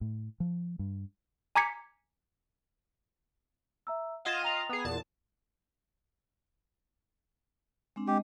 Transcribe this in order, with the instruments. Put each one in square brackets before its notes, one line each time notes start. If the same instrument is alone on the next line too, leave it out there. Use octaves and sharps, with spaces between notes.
[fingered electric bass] A2
F3
G2
[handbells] G#5 A#5 D6 G#6 B6 C#7
[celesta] E5 A#5 E6
[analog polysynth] F4 D#5 F5 [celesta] F#5 G#6 E7
[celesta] G5 A#5 F7
[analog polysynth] B3 G#4
E2 A#2 A5
[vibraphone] G#3 C4 D4
[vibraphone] G#3 D#5 [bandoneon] G4